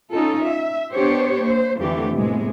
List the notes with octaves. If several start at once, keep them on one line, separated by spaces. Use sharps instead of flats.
C#4 D#4 F4 A4
E5
B3 D4 G4 C5 C#5
A#3 C5
F2 D3 E3 A3 G4
A2 C3 G#3 B3